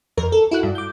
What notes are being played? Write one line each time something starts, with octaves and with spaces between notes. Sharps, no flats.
F2 A#4
A4
E4 F#4 F#6
G2
D6 G6